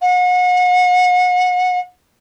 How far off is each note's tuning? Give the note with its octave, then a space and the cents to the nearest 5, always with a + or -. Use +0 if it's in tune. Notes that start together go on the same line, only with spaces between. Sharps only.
F#5 -35